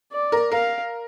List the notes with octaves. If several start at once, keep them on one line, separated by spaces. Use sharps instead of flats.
D5
A#4
A#4 F5